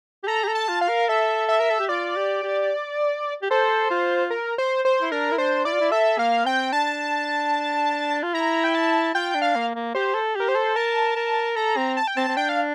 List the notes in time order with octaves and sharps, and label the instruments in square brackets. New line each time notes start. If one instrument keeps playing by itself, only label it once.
[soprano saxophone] G4
[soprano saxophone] A4 [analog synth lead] A#5
[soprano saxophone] G4
A4
[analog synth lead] A5
[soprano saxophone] F4
[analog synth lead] F5
[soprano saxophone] A#4
[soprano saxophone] A4 [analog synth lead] E5
[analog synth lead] E5
[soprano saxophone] A#4
A4
G4
[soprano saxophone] F4 [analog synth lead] D5
[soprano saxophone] G4
G4
G4
[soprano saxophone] A4 [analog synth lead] C5
[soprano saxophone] F4
[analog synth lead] A#4
C5
C5
[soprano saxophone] E4
[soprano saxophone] D4 [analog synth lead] A#4
[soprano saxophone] E4
[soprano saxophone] D4 [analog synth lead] C5
[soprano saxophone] E4 [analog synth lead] D5
[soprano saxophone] F4
E4
[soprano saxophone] A4 [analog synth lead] E5
[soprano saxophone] A#3 [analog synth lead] F5
[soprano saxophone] C4 [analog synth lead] G5
[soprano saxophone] D4 [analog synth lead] A5
[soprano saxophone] F4
[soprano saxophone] E4 [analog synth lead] A#5
[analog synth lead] G5
A5
[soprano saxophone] F4 [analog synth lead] G5
[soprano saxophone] D4
[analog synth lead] F5
[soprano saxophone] A#3
A#3
[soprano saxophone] G4 [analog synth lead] C5
[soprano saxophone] A4
[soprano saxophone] G4 [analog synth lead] A#4
[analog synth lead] C5
[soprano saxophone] A4
[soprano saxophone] A#4 [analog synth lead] A5
[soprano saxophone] A#4
[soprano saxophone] A4 [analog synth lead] A#5
[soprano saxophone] C4
[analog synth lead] A5
G5
[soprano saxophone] C4 [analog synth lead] A5
[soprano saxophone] C4
[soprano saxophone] D4 [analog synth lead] G5
[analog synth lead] F5